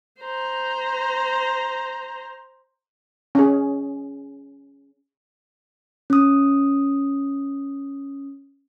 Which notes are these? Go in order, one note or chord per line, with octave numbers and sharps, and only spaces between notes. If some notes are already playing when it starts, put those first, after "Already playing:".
C5 A#5
C#4 G#4
C#4 D#6